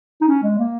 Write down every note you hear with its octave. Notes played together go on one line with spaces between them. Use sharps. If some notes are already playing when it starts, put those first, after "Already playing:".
D#4
C#4
G#3
A#3